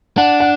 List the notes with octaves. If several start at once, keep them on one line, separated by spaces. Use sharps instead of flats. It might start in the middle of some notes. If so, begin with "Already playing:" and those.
D4 F#5
F#5